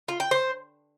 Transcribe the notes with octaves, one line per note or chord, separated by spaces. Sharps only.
F4
G5
C5